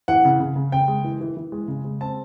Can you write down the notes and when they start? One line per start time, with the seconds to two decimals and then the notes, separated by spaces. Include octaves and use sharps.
0.08 E3 F#5
0.25 C#3
0.40 C#3
0.56 C#3
0.72 C#3 G5
0.88 G#3
1.04 E3
1.21 E3
1.37 E3
1.52 G#3
1.68 C#3
1.84 G#3
2.01 C4 A5